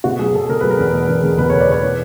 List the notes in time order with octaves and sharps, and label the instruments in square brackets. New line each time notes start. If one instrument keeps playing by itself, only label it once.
[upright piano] B2 F#4
F#3 G#4
B2 A4
B2 A#4
F#3 B4
A#4
E2
B2
E2
E2
B2 B4
C#5
B2
D5
B2 C#5
E3